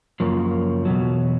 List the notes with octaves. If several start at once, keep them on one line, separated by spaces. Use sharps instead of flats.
F#2 C#3 F3 A#3
E2 B2 F#3